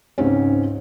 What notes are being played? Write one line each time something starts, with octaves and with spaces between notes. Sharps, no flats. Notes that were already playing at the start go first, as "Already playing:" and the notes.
C#2 G#2 C4 C#4